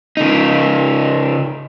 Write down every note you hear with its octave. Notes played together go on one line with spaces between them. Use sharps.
C#3 D#4